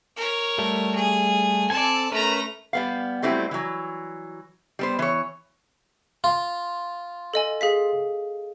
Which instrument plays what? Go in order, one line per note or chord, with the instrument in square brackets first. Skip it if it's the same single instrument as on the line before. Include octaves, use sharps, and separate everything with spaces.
[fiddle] A#4 C#5
[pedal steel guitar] G3 A3
[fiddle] G#4
[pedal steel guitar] C4 A4 G#5 [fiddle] D5 A5
[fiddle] A3 A#5 [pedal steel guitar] C#4 A#4 B4
[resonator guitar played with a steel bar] G3 B3 F5
F#3 G3 A3 C4 E4
E3 F#3
G3 B3 C5
E3 C#5
[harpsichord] F4
[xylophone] A4 D#5 G#5
G#4 F5 B6